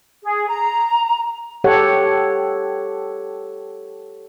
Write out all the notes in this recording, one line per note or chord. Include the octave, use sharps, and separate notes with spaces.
G#4
A#5
G4 A4 C#5 F#5